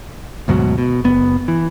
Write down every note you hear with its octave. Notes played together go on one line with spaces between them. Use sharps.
D2 G#2 B2 F#3
B2
F#1 B3
E3